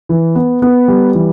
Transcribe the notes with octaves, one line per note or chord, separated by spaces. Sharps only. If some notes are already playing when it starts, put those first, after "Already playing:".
E3
B3
B3
G3
E3